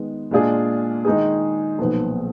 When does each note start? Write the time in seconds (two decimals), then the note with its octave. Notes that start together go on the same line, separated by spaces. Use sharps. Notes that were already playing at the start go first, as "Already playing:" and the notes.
Already playing: D#3 G#3 B3
0.31 A#2 G#3 D4 F4 G#4
1.05 D#3 G#3 D#4 G#4
1.79 B1 A#2 F3 B3